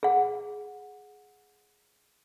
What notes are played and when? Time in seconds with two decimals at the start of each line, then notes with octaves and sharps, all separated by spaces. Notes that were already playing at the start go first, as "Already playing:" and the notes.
0.03 G#4 F#5